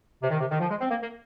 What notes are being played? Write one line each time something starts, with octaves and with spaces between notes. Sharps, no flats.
C3
D#3
C3
D#3
F3
G#3
C4
A#3
A#3